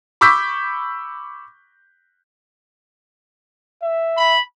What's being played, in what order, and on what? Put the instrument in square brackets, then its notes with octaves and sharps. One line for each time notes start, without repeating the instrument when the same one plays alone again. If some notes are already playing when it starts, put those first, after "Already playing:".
[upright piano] B5 C#6 D6 E6 G6 B6
[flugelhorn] E5
[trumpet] B5